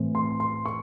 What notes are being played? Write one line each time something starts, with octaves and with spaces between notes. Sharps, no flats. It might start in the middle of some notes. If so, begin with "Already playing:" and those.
Already playing: A2 E3 A3 C4 E4
C6
C6
C#6